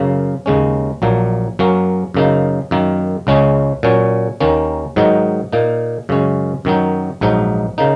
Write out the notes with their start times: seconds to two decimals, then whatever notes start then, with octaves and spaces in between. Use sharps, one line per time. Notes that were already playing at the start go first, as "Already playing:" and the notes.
Already playing: F#2 C#3 A#3
0.46 D#2 C#3 G#3 C#4
1.02 A#1 A#2 F#3 A#3
1.59 F#2 F#3 A#3 C#4
2.14 F#2 C#3 A#3 D#4
2.71 F#2 D#3 A#3
3.27 C#2 C#3 G#3 C#4
3.83 A#2 F#3 C#4
4.40 D#2 D#3 A#3 C#4
4.96 G#2 D#3 F#3 D#4
5.53 A#2 A#3 D#4
6.09 F#2 C#3 G#3 C#4
6.65 F#2 D#3 F#3 D#4
7.21 A#1 G#2 F#3 D#4
7.78 C#3 A#3 D#4